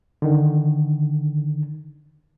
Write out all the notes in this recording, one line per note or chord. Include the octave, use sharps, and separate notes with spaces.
D3 D#3